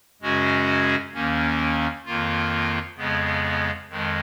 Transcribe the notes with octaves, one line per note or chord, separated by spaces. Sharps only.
F#2 C#3 G#3 C#4 F#4
D#2 D#3 A#3 C#4
F2 D#3 A#3 F4
F2 C#3 G#3 B3
F2 D#3 G#3